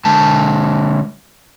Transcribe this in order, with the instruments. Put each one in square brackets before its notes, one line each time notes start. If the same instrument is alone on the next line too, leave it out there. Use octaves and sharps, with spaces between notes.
[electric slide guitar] D3 G#3 A5